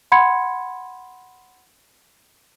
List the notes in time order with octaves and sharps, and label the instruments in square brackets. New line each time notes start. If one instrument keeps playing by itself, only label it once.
[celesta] F#5 B5 C6 G#6 C#7